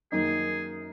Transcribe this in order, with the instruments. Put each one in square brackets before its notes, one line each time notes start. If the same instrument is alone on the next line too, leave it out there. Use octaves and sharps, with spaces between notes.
[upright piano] F#2 D#3 A#3 D#4 [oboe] G#4